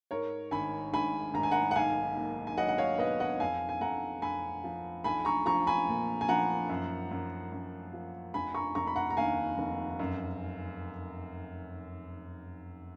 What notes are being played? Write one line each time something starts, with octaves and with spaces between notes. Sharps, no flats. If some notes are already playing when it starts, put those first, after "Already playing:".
G#2 A#4 C#5
G#1 G#5 B5
G#2 G#5 B5
G#1 A#5
G#5
F#5 A#5
F#5
B1 F5 G#5
A#3
G#5
F#3 D#5 F#5
F#5
C#5 F5
B2 B4 D#5
D#5 F#5
F2 F5 G#5
G#5
F2 F#5 A#5
F2 G#5 B5
F3
B1 G#5 B5
A#5 C#6
F3 A#5 C#6
G#5 B5
A#2
G#5
F3 F#5 A#5
F#2
F#2
F#2
F3
F1 G#5 B5
A#5 C#6
F1 A#5 C#6
B5
F#5 A#5
A#5
D#2 F5 G#5
F1
F#2